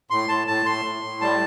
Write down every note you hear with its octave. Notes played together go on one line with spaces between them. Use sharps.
A2 C6
A2 A5
A2 A5
A2 C6
A2
A2
G3 A5